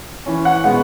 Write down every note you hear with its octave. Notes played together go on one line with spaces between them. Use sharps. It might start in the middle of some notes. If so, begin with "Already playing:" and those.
E3 C#4
F#5
B2 G#3 B3 F#5